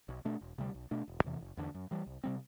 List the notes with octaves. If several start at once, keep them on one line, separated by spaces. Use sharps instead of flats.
B1
B2 A3 D4
E1
D2 C3 G3
B1
B2 A3 D4
E1
E2 C3 E3
F#1
E2 D3
F#2
E3 G3
C2
C3 G3 C4